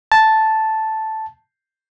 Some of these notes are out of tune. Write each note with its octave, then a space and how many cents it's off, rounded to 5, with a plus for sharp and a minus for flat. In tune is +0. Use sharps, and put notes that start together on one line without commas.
A5 -5